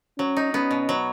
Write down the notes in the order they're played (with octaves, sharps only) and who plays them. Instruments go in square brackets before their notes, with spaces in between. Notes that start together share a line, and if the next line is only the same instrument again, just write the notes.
[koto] F#3 [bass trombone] C#4
[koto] D#4
[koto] B3 [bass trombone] C#4
[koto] B2
F#3